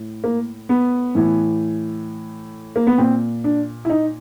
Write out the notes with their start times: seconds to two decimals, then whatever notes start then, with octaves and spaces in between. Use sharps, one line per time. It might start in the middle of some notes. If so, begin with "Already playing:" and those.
Already playing: A2
0.24 A#3
0.69 B3
1.15 A2 E3
2.76 A#3
2.87 B3
2.98 A#2 C4
3.44 D4
3.85 E4
3.90 D#4